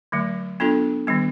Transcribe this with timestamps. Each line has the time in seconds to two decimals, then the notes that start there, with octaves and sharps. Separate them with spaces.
0.12 D3 F#3 A3
0.60 B3 D4 F4 A4
1.07 D#3 G3 B3